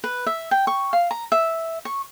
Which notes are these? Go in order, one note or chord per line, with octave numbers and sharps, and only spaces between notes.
B4
E5
G5
C#6
F5
A#5
E5
C#6